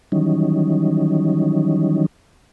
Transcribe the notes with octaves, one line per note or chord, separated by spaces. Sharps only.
D#3 E3 F#3 G3 C#4 D#4